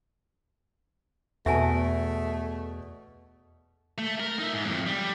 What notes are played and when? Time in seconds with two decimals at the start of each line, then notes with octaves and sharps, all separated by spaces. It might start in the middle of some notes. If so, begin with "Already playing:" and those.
1.46 E2 B2 A3 B3 E5 G#5 A5
3.98 A3
4.20 A#4
4.39 D#4 E5
4.53 G#2
4.66 F2 A2
4.87 G3